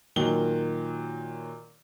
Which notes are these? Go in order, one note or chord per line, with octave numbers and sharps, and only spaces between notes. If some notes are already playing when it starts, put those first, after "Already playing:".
A#2 D#3 F#3 G7